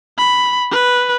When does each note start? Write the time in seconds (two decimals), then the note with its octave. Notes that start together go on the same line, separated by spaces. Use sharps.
0.18 B5
0.71 B4